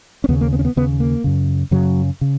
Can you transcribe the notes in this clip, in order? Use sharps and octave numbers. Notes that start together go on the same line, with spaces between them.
C#4
D#2 C#3 B3
A#3
B3
C#4
B3
D#2 C#3 B3
A#3
F#2 C#3
F#2 C#3 F#3
C#3